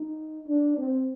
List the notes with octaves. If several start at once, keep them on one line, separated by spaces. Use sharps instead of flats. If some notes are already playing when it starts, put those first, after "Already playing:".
Already playing: D#4
D4
C4